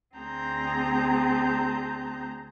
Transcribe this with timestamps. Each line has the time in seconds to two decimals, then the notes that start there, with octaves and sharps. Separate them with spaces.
0.16 D2 C4 G#4 A5 A#5 G6